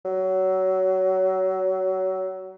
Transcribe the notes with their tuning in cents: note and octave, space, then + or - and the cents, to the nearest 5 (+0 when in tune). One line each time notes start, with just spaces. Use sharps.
F#3 +25